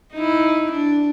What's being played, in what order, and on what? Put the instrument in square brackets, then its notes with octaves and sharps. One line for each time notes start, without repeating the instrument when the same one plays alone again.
[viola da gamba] D#4 E4
D4